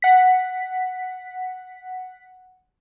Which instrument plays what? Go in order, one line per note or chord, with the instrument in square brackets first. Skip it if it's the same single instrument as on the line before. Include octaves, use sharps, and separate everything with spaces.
[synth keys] F#5 B6